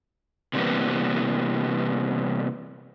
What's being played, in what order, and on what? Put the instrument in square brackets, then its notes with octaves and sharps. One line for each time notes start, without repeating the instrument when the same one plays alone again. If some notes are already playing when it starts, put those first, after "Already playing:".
[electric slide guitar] C3 E3 G3 A#3 B3